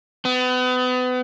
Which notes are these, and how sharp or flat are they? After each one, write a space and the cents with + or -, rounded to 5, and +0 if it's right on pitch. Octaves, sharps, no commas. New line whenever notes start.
B3 +35